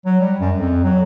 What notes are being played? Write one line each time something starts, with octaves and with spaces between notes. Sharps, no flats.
F#3
G3
F#2
F2
F#3